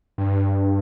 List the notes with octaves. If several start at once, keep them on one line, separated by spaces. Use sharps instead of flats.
G2